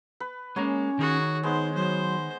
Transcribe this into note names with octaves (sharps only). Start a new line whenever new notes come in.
B4
G#3 A#3 C#4 C#5 A#5 D6
D#3 F#4 G#4
G#3 B3 D#4 C5
F#3 C5